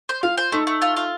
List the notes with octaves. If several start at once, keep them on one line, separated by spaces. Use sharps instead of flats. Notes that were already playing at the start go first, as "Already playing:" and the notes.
C5
F4 F5
C5
A3 D#4
A3
F4
F4